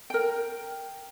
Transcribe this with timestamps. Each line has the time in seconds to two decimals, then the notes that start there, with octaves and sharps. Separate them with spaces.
0.10 A#4 G5